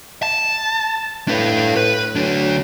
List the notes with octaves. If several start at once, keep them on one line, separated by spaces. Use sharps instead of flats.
A5
A2 D4 B4
B4
D2 F#3 D4